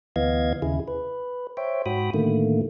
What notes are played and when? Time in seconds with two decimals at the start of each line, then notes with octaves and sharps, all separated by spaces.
0.16 D2 E3 B3 D#5 F5 G#6
0.62 D#2 C#3 E4 G#4
0.88 B4
1.57 C5 C#5 E5 G5
1.86 G#2 F#4 G5 B5 D#6
2.14 A2 D3 D#3 A3 A#3